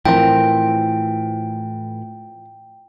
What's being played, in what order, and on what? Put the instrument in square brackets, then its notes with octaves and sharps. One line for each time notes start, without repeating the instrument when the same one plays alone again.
[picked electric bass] A2 E3 [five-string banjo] F3 C4 A#4 [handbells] G5